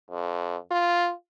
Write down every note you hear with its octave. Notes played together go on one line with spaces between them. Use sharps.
F2
F4